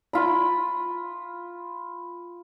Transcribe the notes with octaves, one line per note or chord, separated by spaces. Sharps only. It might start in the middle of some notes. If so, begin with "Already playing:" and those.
F4 B5